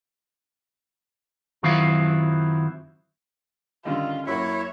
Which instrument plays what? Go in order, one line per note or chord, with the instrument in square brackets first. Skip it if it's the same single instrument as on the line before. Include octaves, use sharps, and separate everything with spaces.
[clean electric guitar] F#2 D#3 F#3 C4 E4 F4
[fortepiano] D3 D#3 G3 [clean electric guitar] C#4 A4 D#5 [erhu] F4
[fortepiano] F#2 F#3 A#3 [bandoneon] E4 E5 [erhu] C#5